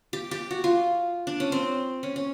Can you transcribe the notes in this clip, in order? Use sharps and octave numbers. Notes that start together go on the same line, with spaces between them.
G4
G4
F#4
F4
D4
C#4
C4
C#4
C#4